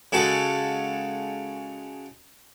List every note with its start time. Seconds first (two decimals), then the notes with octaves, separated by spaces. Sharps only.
0.12 C#3 G#3 F#4 A4